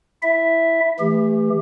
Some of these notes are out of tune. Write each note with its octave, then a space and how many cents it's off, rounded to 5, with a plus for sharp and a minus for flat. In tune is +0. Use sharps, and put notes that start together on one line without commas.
E4 +0 E5 +0
E3 +0 A3 +0 G4 +30